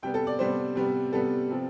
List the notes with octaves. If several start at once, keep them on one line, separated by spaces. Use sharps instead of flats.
C3 G3 B3 G5
A4
D5
C3 G3 B3 C5
C3 G3 B3
C3 G3 B3 A4
C3 F3 C4